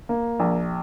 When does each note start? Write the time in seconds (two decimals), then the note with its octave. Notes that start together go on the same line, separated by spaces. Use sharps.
0.09 A#3
0.40 A#1